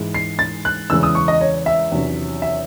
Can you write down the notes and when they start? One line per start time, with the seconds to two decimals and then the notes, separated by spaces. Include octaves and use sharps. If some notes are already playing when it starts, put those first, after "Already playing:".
Already playing: G#2 E3 G#3
0.14 C7
0.39 A6
0.65 F#6
0.90 E2 C#3 E3 G#3 E6
1.03 D#6
1.15 C#6
1.28 D#5
1.41 C#5
1.66 E5
1.91 E2 C3 D#3 F#3 C#4
2.42 E5